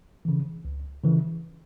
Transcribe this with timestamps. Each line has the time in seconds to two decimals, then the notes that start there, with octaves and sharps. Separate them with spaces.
0.25 C#3 E3
0.65 C#2
1.04 C#3 E3